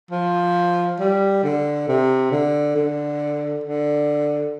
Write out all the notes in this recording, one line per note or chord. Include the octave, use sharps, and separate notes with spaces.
F3
G3
D3
C3
D3
D3
D3